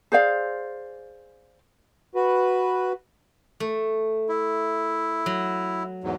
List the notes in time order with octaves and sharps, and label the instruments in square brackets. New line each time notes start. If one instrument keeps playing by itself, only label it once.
[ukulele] G#4 C5 D5 F5
[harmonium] F#4 B4
[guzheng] A3
[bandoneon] E4
[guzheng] F#3
[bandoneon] E2 G#2 F#3